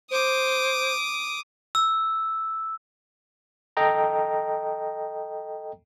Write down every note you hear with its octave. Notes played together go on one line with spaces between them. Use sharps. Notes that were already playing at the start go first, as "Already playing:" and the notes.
C5 D6 D#6
E6
A4 D#5 G5 A#5